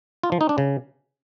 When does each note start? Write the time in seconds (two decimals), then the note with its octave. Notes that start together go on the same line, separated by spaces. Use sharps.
0.23 F4
0.32 F3
0.41 D#4
0.49 D4
0.58 C#3